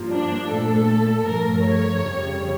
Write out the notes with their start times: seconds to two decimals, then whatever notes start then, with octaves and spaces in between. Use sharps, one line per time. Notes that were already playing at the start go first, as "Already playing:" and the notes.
Already playing: G2 F3 A#3
0.13 D4
0.51 A#2 A3 A4
1.26 G2 F3 A3 A#4
1.65 C#5
2.02 F2 C#3 G3